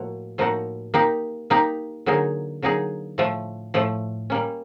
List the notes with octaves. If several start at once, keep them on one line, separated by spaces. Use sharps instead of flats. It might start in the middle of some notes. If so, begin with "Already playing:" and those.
Already playing: A2 F3 A#3 F#4
A2 F3 A#3 D#4 F#4
A#3 D#4 G4
A#3 D#4 G4
D3 F#3 A#3 D#4 G#4
D3 F#3 A#3 D#4 G#4
A2 F3 A3
A2 F3 A3
G3 A#3 C#4